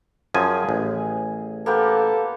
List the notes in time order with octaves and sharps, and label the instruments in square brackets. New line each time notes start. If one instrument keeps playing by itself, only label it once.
[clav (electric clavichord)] F#2 F3 G#5 [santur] G#4
[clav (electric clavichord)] A1
[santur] A#3 B3 G4 [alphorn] A4